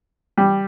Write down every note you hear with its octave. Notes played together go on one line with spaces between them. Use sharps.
G3